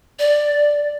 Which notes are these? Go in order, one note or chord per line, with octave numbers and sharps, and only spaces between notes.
D5